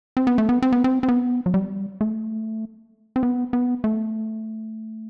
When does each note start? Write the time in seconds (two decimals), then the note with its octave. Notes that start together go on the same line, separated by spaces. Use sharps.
0.17 C4
0.27 B3
0.38 A3
0.49 B3
0.62 C4
0.73 B3
0.84 C4
1.03 C4
1.09 B3
1.46 F#3
1.54 G3
2.01 A3
3.16 C4
3.23 B3
3.53 B3
3.84 A3